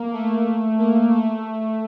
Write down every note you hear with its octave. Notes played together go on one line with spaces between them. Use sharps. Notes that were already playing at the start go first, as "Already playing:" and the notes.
Already playing: A#3
A3
A#3
A3